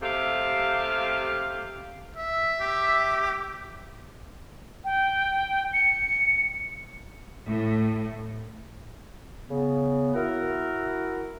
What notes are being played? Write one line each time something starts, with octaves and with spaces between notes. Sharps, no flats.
C3 A3 G4 F5
E5
G4
G5
C#7
A2
C#3 B3
E4 F#4 A#4 F#5